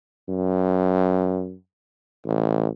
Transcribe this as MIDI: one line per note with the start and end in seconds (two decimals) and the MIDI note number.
0.29 1.56 42
2.25 2.68 33